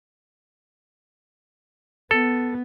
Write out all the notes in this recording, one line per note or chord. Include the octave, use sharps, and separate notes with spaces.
B3 A4